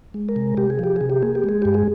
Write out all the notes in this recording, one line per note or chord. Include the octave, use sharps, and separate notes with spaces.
G#3
A#4
C3
C3 G4
G#4
F3 G4
C3 G#4
G4
A#3 G#4
G4
G#3 G#4
G2 G4
G#4